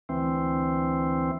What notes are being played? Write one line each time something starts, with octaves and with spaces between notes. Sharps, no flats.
D2 E3 C4